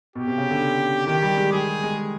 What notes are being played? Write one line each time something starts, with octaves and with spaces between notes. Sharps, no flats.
B2 G4
C3
C#3
D3
D#3 G4
G3
G#3
G3 G#4
G#3